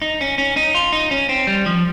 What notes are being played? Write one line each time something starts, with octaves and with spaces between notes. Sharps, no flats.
D#4
C#4
C#4
D#4
F4
D#4
C#4
C4
G3
F3